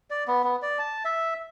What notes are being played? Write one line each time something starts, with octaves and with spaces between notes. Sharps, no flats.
D5
B3
B3
D5
A5
E5